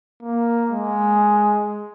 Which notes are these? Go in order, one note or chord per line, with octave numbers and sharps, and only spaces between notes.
A#3
G#3